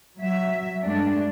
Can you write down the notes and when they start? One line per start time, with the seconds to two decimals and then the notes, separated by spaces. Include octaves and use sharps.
0.19 F#3 E5
0.83 G2 G#3 A3 D4